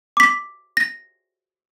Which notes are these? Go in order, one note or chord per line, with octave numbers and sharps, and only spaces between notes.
D6 B6
A#6